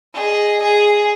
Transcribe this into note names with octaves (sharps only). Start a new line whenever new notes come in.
G#4 D#5
G#4